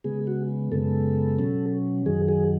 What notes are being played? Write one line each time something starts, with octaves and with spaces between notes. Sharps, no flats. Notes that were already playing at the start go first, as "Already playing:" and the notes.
C#3 G#3 B3 G#4
F#4
F#2 C#3 G#3 B3 A4
B2 F#3 C#4
F#2 D#3 F#3 G#4
G#4